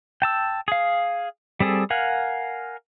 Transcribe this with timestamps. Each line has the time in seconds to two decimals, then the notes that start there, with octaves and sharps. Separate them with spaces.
0.22 G5 A5 E6
0.68 G#4 F5
1.60 G3 C4 G#4 A4
1.90 A#4 F5 F#5 G#5